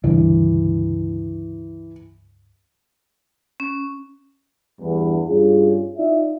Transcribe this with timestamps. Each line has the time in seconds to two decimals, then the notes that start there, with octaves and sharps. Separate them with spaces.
0.04 C#2 G2 D3 E3
3.60 C#4
4.80 E2 G2
5.27 G2 C#4 F4 G#4
5.97 D#4 F4 D5 E5